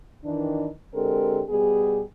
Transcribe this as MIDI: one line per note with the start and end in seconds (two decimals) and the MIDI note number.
0.24 0.68 51
0.24 0.68 52
0.24 0.68 62
0.94 1.41 50
0.94 1.41 56
0.94 1.41 60
0.94 1.41 67
0.94 1.41 69
0.94 1.41 70
1.49 2.02 47
1.49 2.02 55
1.49 2.02 59
1.49 2.02 68